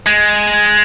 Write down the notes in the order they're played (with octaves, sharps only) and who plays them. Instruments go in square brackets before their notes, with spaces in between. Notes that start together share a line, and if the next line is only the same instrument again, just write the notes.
[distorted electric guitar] G#3